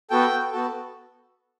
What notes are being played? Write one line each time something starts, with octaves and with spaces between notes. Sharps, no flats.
B3 F#4 A4 G5
B3 F#4 A4